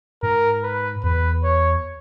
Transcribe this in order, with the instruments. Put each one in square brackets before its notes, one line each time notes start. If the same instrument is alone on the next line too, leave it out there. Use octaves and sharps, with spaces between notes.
[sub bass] G#2 [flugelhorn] A#4
[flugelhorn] B4
[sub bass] E2 [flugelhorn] B4
[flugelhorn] C#5